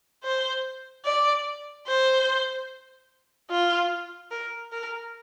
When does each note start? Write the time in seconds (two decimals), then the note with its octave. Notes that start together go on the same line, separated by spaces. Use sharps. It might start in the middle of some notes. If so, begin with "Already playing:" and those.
0.24 C5
1.05 D5
1.87 C5
3.50 F4
4.31 A#4
4.73 A#4